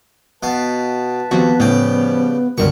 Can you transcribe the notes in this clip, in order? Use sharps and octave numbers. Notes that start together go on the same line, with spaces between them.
B2 B4 F5 A5
D#2 F3 B3 C4 F#4
A2 C#3 F3 G3 G4
C#2 G2 B2 D3 A#4 C#6